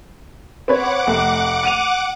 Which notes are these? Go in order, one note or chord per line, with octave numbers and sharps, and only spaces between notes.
C4 B4 C#5 F#5 D6
F1 A3
D7 D#7 F7